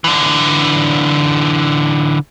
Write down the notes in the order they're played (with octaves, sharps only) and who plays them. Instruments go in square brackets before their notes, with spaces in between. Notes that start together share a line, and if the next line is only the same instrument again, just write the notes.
[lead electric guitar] D3 E3